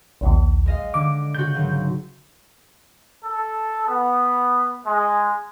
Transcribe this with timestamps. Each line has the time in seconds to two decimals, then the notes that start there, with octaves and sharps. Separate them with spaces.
0.21 A#1 D#2 A#2
0.66 G#3 D#5 F5
0.94 D3 D6
1.35 C#3 F#4 G6
1.55 G#1 F#3
3.23 A4
3.86 B3
4.85 G#3